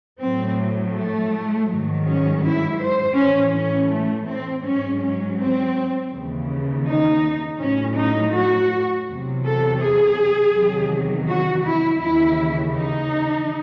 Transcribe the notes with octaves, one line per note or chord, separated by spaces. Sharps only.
A2 F#3 C4
A3
G#2 D#3 F#3
C#4
E4
C5
A2 E3 C#4
C#4
A3
C4
G#2 F#3 C#4
C#4
C4
D#2 C#3 E3
D#4
A2 F#3 C#4
D#4
F#4
E2 C3 F#3
A4
G#4
E2 C3 D#3 F#3
F#4
E4
D#2 C#3 E3 E4
D#4